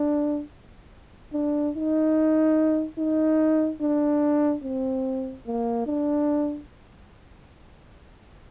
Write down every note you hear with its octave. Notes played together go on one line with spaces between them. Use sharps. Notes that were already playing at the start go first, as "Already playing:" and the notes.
Already playing: D4
D4
D#4
D#4
D4
C4
A#3
D4